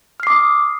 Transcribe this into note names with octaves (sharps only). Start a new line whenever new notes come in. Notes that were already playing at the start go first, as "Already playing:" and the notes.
D6 D#6 F6 C7